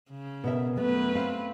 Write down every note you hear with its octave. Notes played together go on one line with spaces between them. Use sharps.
C#3
B2 A#4 E5
F#2 A3 B3 B4
C4 F5